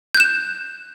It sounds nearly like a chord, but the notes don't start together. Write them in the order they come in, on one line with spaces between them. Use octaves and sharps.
G6 F#6 E7